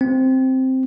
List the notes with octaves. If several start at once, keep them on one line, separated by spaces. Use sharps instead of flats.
C4